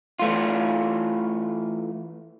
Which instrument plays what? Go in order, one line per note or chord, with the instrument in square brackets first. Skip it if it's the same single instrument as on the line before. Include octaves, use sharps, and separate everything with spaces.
[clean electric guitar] E3 A3 F4